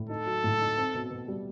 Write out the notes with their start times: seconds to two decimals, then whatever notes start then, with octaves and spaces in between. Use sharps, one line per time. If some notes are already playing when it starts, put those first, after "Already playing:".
Already playing: A2
0.09 D#4 A4
0.26 F#3
0.44 A2
0.60 D#4
0.77 C4
0.94 B2
1.11 B2
1.28 G3